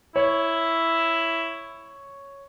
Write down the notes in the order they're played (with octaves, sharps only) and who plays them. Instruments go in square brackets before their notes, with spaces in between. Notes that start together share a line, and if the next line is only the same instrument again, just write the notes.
[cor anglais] E4 [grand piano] C#5